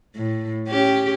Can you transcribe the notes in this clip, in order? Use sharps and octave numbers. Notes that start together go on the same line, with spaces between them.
A2
C#4 G4